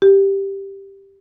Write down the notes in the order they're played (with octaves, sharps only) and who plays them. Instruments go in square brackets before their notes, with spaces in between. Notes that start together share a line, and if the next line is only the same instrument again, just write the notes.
[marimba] G4